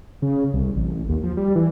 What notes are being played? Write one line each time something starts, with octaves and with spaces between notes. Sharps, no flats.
C#3
C2
A1
D#2
F3
G3
E3